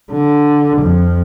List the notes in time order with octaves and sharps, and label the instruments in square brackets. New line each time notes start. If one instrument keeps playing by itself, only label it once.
[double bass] D3
F2